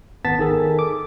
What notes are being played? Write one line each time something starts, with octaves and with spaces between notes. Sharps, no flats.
G#1 B3 A5 A6 B6
D#3 G#4 A4
D6